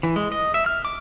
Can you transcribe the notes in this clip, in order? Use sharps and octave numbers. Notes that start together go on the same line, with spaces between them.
E3
G#3
D#5
E5
F6
D6